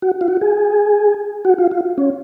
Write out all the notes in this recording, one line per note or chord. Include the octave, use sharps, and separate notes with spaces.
F#4
F4
F#4
G#4
F#4
F4
F4
C#4